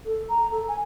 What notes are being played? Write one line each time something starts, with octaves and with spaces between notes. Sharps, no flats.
A4
A#5
A4
G#5